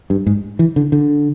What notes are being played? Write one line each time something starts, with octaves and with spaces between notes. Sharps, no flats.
G2
G#2
E3
D3
D3